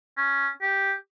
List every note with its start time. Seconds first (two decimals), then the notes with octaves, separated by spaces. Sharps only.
0.17 C#4
0.62 G4